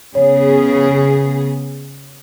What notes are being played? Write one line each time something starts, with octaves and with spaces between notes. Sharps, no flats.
C#3 B3 G#4 C#5